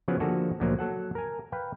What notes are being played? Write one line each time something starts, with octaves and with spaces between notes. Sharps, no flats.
C#3 F3 F#3 B3 F#5 G#5
D3 F3 A#3 F#4 G#4 A4
D2 A#2 F3 F#3 A#3
F#3 A4 F#5
A#4 G#5
B4 F5 G5